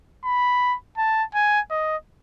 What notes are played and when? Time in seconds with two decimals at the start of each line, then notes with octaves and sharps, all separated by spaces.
0.24 B5
0.98 A5
1.34 G#5
1.71 D#5